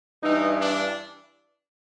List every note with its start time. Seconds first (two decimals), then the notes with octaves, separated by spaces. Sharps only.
0.23 G2 E3 D#4
0.60 D4